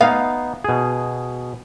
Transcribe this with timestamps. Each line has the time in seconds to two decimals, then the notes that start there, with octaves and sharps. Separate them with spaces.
0.01 B3 D#4 F5
0.64 B2 G#4